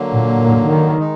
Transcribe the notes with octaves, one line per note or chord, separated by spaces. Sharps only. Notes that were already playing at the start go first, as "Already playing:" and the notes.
Already playing: D3 F#3 A#3
A#2
A#2
D#3
D#3 G#3 D#4